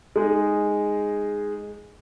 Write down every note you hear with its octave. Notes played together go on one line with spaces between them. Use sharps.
G#3 D#4 G#4